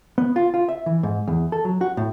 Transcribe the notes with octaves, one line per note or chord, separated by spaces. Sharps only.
B3
F4
F4
E5
E3
G#2
E2
A4
F#3
F#4
A2